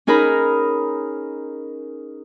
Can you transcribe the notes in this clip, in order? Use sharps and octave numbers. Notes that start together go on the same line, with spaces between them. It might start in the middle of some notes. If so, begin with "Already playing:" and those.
C#4 D#4 G#4 A#4 A#5 B5